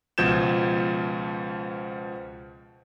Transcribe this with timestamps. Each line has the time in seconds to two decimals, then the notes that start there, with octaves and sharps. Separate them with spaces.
0.18 C#2 B2 F3 G6 G#6 E7